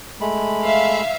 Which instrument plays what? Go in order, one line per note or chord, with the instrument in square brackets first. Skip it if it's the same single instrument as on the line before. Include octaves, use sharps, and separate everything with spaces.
[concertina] G#3 A3 B5
[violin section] E5 F5